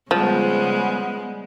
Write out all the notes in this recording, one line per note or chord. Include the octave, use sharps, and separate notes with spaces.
C#3 F3 G3 G#3 B3